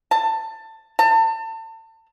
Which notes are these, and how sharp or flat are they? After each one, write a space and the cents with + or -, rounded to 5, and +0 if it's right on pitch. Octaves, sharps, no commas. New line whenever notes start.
A5 +15
A5 +35